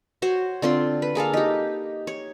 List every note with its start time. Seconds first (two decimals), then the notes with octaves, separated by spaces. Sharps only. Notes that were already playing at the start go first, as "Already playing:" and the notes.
0.22 F#4 C5 C#5
0.62 D3 C4 F4 C6
1.02 B4
1.15 A#3 G#4 A4 F5
1.33 D#4 G4
2.07 C#5